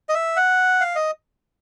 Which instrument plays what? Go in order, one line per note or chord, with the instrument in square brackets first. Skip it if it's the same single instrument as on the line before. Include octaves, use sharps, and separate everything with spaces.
[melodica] D#5
E5
F#5
F5
D#5